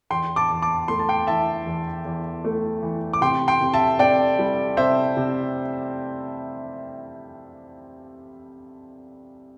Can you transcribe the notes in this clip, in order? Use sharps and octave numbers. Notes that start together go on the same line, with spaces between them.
E2 G5 C6
A5 D6
E2
A5 D6
A3 C6
A5
G5 C6
E3 E5 A5
E2
E2
A3
E3
D6
C3 G5 C6
G5 C6
C3
E5 A5
C4 D5 G5
G3
C3 C5 E5
C3